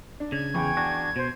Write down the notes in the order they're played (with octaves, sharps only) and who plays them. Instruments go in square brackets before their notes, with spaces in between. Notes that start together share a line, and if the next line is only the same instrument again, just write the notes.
[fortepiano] D4
[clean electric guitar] C#3 [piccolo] G#6
[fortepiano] E2 [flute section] G5 G#5 C#6
[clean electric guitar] D4 F#4
[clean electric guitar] B2 [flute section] C5